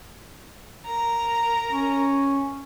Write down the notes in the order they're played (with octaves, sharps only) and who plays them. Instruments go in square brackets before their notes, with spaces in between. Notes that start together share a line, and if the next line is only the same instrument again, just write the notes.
[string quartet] A#4 A#5
[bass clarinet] C#4